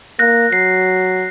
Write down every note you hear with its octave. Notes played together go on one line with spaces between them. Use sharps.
A#3 F#6 A#6
F#3 C7